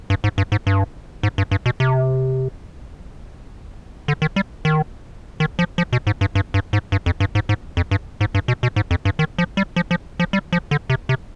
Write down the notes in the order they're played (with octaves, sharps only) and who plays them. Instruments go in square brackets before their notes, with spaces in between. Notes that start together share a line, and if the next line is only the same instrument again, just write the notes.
[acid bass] G2
G#2
G2
G#2
G2
G#2
G2
G2
B2
C3
D3
D#3
G3
D#3
D#3
F3
F3
B2
G#2
G2
G2
G2
G#2
G2
F2
G2
G#2
G#2
F2
G2
G#2
G2
B2
B2
G#2
F2
G2
D#3
F3
G3
F3
F3
F3
G3
F3
D3
C3
C3